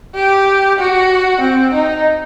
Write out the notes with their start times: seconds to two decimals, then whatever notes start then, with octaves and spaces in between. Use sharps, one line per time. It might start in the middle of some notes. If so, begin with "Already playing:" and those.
0.15 G4
0.79 F#4
1.41 C4
1.74 D#4